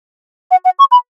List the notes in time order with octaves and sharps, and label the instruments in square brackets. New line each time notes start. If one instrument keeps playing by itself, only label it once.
[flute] F#5
F#5
C#6
B5